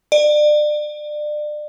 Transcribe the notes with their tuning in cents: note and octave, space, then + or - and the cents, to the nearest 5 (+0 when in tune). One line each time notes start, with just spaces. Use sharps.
D5 +30